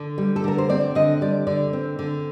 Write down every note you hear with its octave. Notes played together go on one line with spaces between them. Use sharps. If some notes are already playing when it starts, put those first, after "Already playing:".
Already playing: D3
G3
A4
D3 A#4
C5
C4 D5
D3 D#5
G3 D5
D3 D5
C4
D3